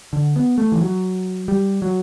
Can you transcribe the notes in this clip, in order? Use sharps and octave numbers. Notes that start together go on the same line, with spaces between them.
D3
B3
A3
E3
F#3
G3
F#3